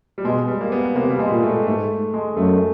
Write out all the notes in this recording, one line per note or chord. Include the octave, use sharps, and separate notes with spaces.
G3
B2 G#3
G3
A#3
B3
C3 A#3
G3
G#3
A#2
A3
G#2 A3
G#3
F#2 A3